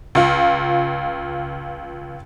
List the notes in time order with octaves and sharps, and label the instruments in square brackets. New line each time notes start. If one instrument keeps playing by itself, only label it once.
[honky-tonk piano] C#2 F4